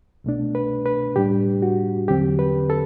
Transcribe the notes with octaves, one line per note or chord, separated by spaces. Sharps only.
C2 B2 A3 D4
B4
B4
A2 G3 D4 G4
F#4
E2 D3 F#3 C4 G4
B4
A4